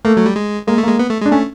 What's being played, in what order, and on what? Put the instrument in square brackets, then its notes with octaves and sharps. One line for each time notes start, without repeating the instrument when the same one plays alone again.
[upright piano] A3 [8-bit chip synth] A#3
[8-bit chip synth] F#3
G3
G#3
[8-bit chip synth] G#3 [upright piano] A#3
[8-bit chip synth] A3
[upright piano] A#3
[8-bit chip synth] G#3
B3
A3
G#3
[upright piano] D4
[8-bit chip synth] A3 [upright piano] C#4